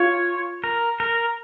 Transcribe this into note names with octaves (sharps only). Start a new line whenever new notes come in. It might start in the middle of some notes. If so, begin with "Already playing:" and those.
Already playing: F4 C#5
A#4
A#4